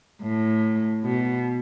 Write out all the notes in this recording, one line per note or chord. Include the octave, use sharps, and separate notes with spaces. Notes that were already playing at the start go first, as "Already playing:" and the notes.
A2
B2